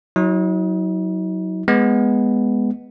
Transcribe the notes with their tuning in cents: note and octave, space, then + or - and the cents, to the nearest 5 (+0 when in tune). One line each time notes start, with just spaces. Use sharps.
F#3 +0 D#4 +45
G#3 +0 B3 +0